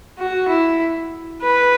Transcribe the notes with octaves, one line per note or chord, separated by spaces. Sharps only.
F#4
E4
B4